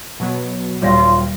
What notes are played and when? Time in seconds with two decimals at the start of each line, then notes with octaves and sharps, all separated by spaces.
0.20 B2 F#3 B3
0.82 D#1 F#3 G3 F4 C#5 A#6